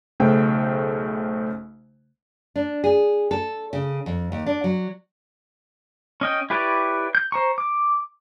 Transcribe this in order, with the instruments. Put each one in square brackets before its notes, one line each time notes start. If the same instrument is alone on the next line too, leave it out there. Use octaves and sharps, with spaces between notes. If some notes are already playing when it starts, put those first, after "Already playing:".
[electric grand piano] B1 C#3 A3 C5 G5
[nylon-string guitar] D4
G#4
A4
C#3
F2
D#2
D4
F#3
[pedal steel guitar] C#4 D#5 G5
E4 G4 B4 C#5 D5
G6
C5 A#5 C#6
D6